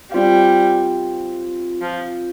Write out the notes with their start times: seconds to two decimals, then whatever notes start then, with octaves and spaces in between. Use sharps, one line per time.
0.12 G3 C4 F4 C5 F5
1.82 F3